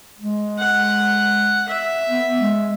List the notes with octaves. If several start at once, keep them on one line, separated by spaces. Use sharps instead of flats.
G#3
F#5
E5
B3
G#3